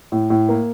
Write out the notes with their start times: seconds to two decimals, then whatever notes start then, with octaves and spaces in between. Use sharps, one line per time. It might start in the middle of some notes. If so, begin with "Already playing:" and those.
0.12 A2
0.30 A2
0.49 A#3